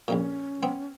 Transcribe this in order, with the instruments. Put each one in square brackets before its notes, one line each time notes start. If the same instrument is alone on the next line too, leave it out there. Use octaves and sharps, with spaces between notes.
[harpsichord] A#1 F2 A#2 [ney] C#4
[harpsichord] B3 C4